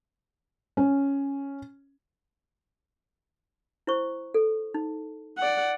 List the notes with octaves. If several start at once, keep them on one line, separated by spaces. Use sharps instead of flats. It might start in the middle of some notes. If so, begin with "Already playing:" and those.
C#4
E4 C5 C#6
A4
D#4
D5 F#5